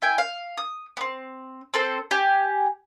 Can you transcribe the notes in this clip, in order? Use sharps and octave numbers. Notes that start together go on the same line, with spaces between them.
E4 G5 G#5
F5
D#6
B3 C4
C4 A4 C5
G4 G#5